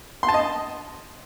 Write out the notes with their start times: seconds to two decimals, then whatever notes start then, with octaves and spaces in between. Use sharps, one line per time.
0.23 C6
0.28 A5
0.34 D#5